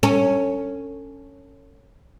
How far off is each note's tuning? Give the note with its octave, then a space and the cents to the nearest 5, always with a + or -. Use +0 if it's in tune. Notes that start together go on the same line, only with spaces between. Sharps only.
C#4 +0 A4 +35